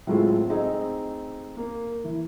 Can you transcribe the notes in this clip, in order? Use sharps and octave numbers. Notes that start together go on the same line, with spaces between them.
A2 F#3 G#3 A3 C4 F4
A3 C4 D#4 G#4 A4 D#5
A#3
E3